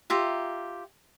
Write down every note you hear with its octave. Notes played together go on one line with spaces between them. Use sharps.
F4 G4 E5 A#5